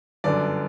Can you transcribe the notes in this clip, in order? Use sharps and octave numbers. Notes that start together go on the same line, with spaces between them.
G1 F#2 D3 D5